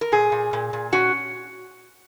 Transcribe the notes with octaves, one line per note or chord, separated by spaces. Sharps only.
A#4
A#2 G#4
A#2
A#2
A#2
C#4 F#4